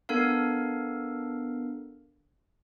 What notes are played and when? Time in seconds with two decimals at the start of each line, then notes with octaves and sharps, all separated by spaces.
0.09 B3 D4 A4 A#4 F5